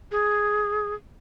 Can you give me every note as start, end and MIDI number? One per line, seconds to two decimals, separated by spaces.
0.12 0.94 68